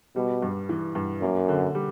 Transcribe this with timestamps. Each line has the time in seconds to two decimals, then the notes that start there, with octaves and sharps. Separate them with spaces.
0.16 B2 G3
0.42 G2
0.69 E3
0.95 G2
1.21 F#2 A#3
1.49 D3
1.75 G3